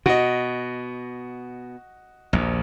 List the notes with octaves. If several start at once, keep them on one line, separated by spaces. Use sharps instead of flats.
B2 F#4 D#5
A#1 D#2